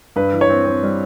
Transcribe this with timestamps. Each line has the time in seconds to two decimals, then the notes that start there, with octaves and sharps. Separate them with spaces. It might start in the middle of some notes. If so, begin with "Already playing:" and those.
0.16 G2 B4
0.33 E3
0.41 C#5
0.49 C4
0.65 C4
0.83 G3